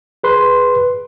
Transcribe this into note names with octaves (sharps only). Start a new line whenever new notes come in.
G#4 B4 C6